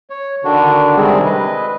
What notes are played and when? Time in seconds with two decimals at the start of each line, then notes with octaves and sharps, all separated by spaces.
0.10 C#5
0.44 D3 D#3 D4 F#4
0.97 C3 D#3 G3 G#3 C4 G#4
1.25 B4 D#5